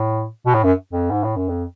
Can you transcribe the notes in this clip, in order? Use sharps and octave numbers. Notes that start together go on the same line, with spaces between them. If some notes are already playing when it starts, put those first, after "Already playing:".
Already playing: A2
B2
A2
F#2
F2
G#2
A2
F#2
F2